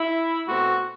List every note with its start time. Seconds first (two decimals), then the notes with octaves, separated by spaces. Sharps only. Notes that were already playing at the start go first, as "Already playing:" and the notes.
Already playing: E4
0.47 B2 A3 C4 F#4